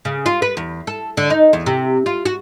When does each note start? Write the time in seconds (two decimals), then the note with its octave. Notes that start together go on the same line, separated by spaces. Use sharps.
0.05 C#3
0.26 F4
0.42 B4
0.57 E2
0.87 A4
1.17 D3
1.30 D#4
1.53 E2
1.66 C3
2.06 F4
2.25 F#4